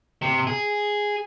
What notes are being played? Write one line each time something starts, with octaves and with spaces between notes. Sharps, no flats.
C3
G#4